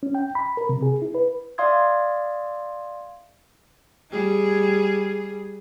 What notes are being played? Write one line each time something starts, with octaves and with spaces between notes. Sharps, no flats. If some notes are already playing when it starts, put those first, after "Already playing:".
C#4
G5
B5
A#4
C3
G#4
E4
B4
D5 E5 F5 C6 D#6 G#6
G3 G#4